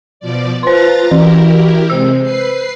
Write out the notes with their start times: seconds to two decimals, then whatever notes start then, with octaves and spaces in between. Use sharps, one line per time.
0.20 B2 F3 D5
0.63 F4 B4 C5 A#5 C6 A6
1.11 E3 E4 F#4 G4 A#4
1.90 C3 G#3 C5 E6
2.23 B4 C7